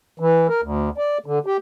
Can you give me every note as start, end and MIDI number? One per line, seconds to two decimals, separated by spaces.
0.19 0.47 52
0.49 0.61 70
0.63 0.89 38
0.98 1.18 74
1.26 1.39 50
1.46 1.57 67